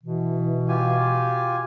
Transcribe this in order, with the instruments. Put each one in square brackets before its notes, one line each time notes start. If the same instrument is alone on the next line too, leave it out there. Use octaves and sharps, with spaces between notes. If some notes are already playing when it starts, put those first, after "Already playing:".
[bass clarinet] B2 [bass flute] E3
[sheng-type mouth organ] F4 G4 G#5